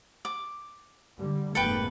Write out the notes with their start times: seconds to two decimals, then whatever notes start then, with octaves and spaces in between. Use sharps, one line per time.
0.25 D6
1.17 D3 G3
1.55 F1 G#2 A#3 A4 B4 G5